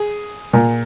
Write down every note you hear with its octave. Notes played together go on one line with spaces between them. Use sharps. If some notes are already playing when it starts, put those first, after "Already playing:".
Already playing: G#4
A#2